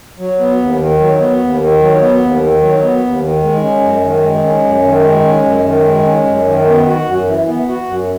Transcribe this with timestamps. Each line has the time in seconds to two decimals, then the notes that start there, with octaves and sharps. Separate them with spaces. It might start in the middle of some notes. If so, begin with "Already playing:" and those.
0.19 F#3
0.39 B3
0.58 D#2
0.80 D#3
1.00 F#3
1.19 B3
1.40 D#2
1.61 D#3
1.80 F#3
2.01 B3
2.20 D#2
2.41 D#3
2.61 F#3
2.82 B3
3.02 D#2
3.23 D#3
3.42 G#3
3.62 C#4
3.83 F#2
4.04 D#3
4.23 G#3
4.43 C#4
4.64 F#2
4.84 D#3
5.04 G#3
5.25 C#4
5.45 F#2
5.65 D#3
5.85 G#3
6.06 C#4
6.26 F#2
6.46 D#3
6.67 B3
6.87 F#4
7.06 F#2
7.27 E3
7.48 B3
7.68 F#4
7.87 F#2